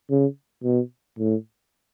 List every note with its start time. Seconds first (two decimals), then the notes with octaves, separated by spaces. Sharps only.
0.10 C#3
0.64 B2
1.19 A2